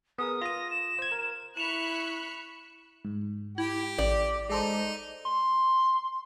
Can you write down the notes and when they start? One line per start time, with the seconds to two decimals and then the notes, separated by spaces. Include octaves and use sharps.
0.18 B3 G#4 A#4 D#6
0.41 F4 D#6 A#6
0.71 E7
0.99 C5 G#6
1.12 A#4
1.57 E4 B5 C#6 F#6 E7 F7
3.05 G#2
3.58 E4 G4
3.98 A1 D5
4.50 G#3 D#4 A4 C5
5.25 C6